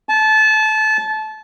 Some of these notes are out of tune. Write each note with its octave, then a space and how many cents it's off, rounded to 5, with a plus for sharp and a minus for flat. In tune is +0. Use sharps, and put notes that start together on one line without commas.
A5 -25